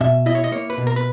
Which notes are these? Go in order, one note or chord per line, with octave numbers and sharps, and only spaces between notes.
B2 E5
E4 D#5
C#5
D#5
A#3 C#5
B4
B2
A#4
B4